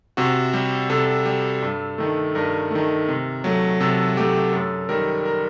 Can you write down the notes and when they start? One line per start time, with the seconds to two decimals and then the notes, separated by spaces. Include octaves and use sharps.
0.17 C3 F#4
0.54 G3
0.90 C3 A4
1.26 G3
1.62 G2
1.98 D#3 A3
2.35 G2 A#4
2.71 D#3 A3
3.08 C3
3.44 F#3 A3
3.80 C3 A4
4.17 F#3 A3 G4
4.52 F#2 A4
4.89 D#3 G3 A#4
5.25 A#4